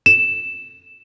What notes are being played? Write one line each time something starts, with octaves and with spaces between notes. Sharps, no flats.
E7